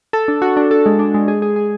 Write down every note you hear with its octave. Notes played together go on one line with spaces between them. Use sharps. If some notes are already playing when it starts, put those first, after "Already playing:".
A4
D4
F#4
D4
A4
G#3
D4
G#3
G#4
G#4
G#4